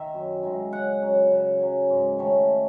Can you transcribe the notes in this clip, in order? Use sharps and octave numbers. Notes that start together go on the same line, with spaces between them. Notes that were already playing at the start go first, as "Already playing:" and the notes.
Already playing: D#3 E5
F#2
D#3 G#3
C#3 F#5
F#3 C#4
C#3
F#3 C#4
G#2
D#3 A3 C#4